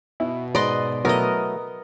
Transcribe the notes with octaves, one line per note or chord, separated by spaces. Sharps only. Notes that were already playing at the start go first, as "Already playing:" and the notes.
B2 E4
G#2 B4 D5 D#5 C6
F#3 A3 B3 E4 A#4 D#5